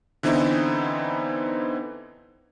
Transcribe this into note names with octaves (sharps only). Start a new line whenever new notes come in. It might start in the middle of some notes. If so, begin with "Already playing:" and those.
D3 E3 B3 C4 D#4 E4